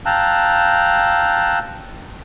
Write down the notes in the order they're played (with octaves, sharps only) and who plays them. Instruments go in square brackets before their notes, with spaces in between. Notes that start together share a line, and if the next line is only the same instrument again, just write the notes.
[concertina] F5 G5 A5 A#5 E6 F#6